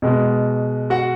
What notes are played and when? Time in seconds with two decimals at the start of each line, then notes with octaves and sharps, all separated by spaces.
0.02 B2 G#3
0.90 F#4 F#5